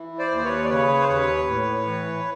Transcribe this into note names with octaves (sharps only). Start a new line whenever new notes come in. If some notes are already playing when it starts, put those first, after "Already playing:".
Already playing: E3
C5 D5
D#2
C5
B4 C#5
D5
C#3 B4 C#5
C5
D#2 B4 C#5
A2
E3